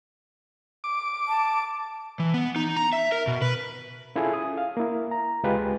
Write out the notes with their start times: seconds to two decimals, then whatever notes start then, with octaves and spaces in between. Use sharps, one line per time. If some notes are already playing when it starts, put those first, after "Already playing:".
0.84 D6
1.28 A5
2.20 E3
2.34 B3
2.56 D#4
2.77 A#5
2.93 E5
3.12 A#4
3.27 B2
3.42 B4
4.16 C#4 E4 F4 G#4 A4 G#5
4.33 D#6
4.57 F5
4.77 A#3 E4
5.11 A#5
5.43 C#2 G#3 F4 G4 G#4 B4